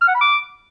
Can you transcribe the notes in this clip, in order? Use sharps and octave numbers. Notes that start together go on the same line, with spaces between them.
F6
F#5
B5
D6